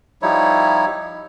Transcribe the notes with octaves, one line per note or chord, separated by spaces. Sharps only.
F3 G3 D#4 E4 C#5